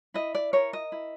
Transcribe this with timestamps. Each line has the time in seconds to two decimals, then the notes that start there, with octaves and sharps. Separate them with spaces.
0.14 E4 D#5
0.35 D5
0.53 A#4 C#5
0.73 D#5
0.92 E4